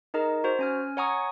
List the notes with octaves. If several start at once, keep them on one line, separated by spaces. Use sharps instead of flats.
D#4 G#4 A#4 D#5 A#5
F#4 C5
C#4 G#5 F6
C#5 F#5 G#5 A#5 C#6 D#6